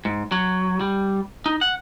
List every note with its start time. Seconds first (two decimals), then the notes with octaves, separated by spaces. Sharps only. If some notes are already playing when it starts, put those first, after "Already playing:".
0.05 G#2
0.32 F#3
0.80 G3
1.46 D#4
1.61 F#5